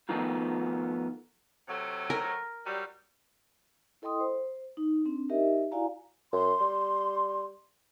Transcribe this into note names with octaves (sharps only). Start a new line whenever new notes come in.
D#3 F3 A3 B3 D#4 F4
C3 F#3 A3
A#4
F#3 G3
E4 A4 D#5 G5 C6 D#6
C5
D#4
C4 D4
D#4 G4 A#4 D#5 E5
E4 F#4 D5 F5 G#5 A#5
F#2 C6
G3